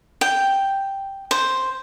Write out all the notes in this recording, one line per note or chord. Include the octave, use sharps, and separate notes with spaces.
G5
C5